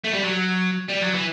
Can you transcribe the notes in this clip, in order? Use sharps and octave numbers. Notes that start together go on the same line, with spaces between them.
A3
G3
F#3
G3
F#3
E3